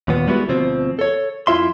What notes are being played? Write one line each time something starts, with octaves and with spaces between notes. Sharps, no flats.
D#2 A#2 B3
G3 G#3 B3 E4 F#4 B4
D2 B2 F3 C4 C5
A4 C#5
F2 E4 F4 E5 C6